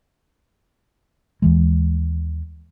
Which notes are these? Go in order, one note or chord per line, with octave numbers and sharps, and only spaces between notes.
D#2 E3 G#3